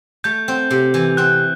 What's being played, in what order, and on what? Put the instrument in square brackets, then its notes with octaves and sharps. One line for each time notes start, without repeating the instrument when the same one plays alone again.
[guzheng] A3 [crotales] G6
[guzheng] C4
C3
E3
[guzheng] C4 [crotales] F#6